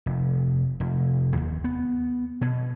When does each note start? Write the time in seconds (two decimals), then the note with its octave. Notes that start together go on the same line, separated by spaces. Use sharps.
0.06 F1
0.80 F1
1.36 D#2
1.64 B3
2.41 B2